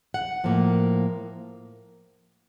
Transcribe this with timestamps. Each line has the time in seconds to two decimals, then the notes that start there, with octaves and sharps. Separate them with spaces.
0.14 F#5
0.44 A2 F3 A#3